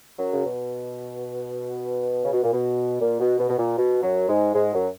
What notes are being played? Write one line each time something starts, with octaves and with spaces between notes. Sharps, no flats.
F#2 F#3
C#3
B2
C#3
B2
A#2
B2
A#2
B2
B2
B2
A#2
B2
F#2 F#3
G#2 G#3
G#2 G#3
F#2 F#3